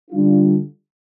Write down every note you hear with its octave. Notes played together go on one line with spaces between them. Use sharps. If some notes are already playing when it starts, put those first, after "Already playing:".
D3 G3 D4 F4